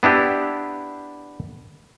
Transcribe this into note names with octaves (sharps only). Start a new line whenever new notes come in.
B3 D4 E4 G4